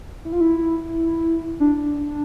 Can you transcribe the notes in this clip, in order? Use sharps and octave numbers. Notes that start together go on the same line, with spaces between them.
E4
F4
E4
D4